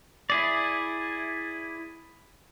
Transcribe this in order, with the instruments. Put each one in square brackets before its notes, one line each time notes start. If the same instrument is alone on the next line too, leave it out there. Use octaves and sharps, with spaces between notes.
[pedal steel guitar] E4 G#4 D5